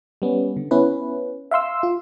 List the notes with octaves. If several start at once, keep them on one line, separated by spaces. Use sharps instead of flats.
G3 B3 C#4
D3
B3 C#4 E4 B4
E5 F5 C6 E6
F4